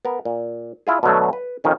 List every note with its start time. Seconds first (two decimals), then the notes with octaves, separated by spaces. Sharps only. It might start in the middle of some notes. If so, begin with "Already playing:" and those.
0.05 B3 A#4
0.25 A#2
0.87 E4 F4 G#4
1.03 B2 D3 F#3 A3
1.33 B4
1.64 F2 D#3 C#4